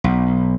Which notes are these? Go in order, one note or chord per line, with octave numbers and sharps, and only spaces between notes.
B1